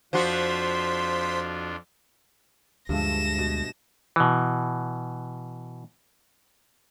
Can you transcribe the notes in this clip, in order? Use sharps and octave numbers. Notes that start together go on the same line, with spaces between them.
F2 F3 D4 F4 F#4 C5 C6 B6
D2 G2 F3 G#3 A3 A#6 E7
B2
B2 E3